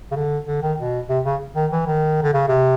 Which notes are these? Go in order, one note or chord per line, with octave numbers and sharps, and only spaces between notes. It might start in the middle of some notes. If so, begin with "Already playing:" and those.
C#3
D3
D3
D#3
B2
C3
C#3
D#3
E3
D#3
D3
C#3
C3